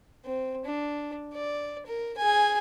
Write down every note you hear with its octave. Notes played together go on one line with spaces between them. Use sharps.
C4
D4
D5
A#4
G#4 G#5